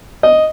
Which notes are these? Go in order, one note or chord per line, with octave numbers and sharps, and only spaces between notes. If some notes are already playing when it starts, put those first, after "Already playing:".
D#5